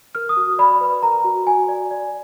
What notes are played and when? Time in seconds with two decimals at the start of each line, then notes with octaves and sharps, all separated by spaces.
0.15 A#4 F6
0.29 D#6
0.37 F#4
0.59 D5 B5
0.81 B4
1.02 A#4 A#5
1.24 F#4
1.46 F#4 G#5
1.68 D5
1.91 D5